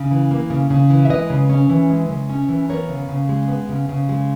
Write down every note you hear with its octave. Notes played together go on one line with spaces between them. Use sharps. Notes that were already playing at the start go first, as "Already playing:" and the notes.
Already playing: C#3
E3
A#3
C#3
C#3
E3
E5
G#3 B4 D#5
C#3
C#4
E3
G#3
C#3
C#4
E3
B3 A#4 C#5
C#3
C#3
G#3
B3
C#3
C#3
G#3